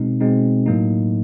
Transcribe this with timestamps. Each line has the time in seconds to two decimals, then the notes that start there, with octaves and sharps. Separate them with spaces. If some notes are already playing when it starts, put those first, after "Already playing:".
Already playing: B2 G#3 C4 D#4
0.20 B2 G#3 C4 D#4
0.66 A2 F#3 A#3 D#4